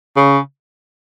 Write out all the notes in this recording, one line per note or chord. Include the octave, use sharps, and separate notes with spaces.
C#3